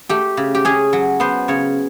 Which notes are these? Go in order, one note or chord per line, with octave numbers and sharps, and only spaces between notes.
A3 G4
C#3
G4
C#4 G#4
F#3
B3 C5
C#3 C#5